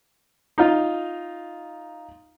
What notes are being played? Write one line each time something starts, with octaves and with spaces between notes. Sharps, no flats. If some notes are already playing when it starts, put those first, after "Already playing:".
D#4 F4